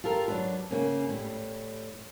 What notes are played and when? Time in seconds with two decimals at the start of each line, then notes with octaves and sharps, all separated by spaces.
0.04 F4 G4 A4 A#4
0.28 F#3 D4 B4
0.71 C#3 A#3 B3 C#4
1.09 A2 G3